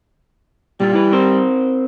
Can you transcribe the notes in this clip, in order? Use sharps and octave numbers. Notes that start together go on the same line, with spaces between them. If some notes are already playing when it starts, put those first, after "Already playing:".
A#2 G3 F4
E4 B4
C4 A#4 C5